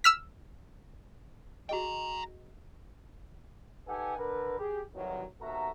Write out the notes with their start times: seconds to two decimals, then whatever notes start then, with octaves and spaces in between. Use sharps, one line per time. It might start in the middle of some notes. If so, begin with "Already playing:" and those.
0.04 E6 F6 B6
1.69 F#4 G#4 D#5 G5 A#5
3.87 D#4 G4 A4 B4 F#5 G#5
4.17 D3 A#4 B4
4.59 G4 G#4
4.94 C2 F2 D#3 E3 F#3
5.41 D#2 B2 F#4 A4 E5 A#5